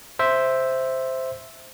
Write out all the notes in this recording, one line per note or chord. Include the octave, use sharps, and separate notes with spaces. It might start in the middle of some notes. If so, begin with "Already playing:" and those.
C5 E5